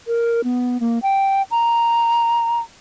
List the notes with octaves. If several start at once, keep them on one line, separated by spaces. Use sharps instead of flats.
A#4
B3
A#3
G5
A#5